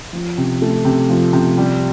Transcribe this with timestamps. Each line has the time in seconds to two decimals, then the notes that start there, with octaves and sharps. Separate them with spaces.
0.13 F3
0.37 C3
0.62 A3
0.85 C3
1.09 F3
1.33 C3
1.58 G3